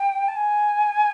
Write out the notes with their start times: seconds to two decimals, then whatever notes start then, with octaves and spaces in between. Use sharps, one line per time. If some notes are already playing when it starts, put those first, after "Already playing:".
Already playing: G5
0.28 A5
0.36 G#5